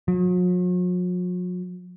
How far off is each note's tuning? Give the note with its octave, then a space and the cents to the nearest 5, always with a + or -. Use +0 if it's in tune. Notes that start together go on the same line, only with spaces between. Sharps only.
F#3 -45